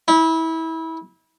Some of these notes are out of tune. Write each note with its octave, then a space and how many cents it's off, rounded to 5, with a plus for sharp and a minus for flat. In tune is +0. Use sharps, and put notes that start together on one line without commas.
E4 -25